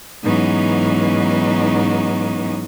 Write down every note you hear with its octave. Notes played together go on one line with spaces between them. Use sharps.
G#2 E3 F#3 B3 C#4 D#4